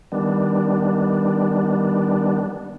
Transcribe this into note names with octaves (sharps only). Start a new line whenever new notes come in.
D#3 G3 B3 D4